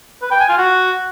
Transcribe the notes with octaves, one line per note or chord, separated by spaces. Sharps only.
B4
G5
G#5
F4
F#4